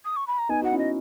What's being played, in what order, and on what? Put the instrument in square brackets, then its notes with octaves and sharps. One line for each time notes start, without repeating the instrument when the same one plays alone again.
[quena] D#6
C#6
B5
A#5
[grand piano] B3 D#4 [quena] G#5
[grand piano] F#4 [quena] F#5
[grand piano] C#4 E4
[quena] D#5